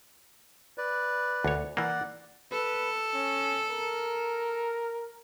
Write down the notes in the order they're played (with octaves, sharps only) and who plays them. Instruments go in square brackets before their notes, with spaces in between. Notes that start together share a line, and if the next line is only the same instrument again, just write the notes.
[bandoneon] B4 D5
[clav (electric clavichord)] D2 C#5
[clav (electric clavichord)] E3 A#3 [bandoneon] D5 F#5
[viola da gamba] A4 [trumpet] B4
[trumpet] C#4
A#4